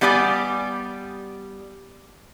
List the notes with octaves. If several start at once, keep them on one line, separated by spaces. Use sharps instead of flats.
G3 B3 G4 D5 F5 G#5